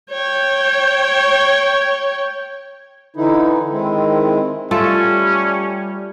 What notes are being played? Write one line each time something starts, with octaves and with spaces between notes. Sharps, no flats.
C#5 G5
D3 E3 D#4 E4
D#3 G#3 C4 E4
G3 A3 C#4 F4 A4